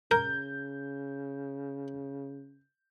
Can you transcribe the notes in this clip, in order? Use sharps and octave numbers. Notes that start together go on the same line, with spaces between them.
C#3 A#4 G6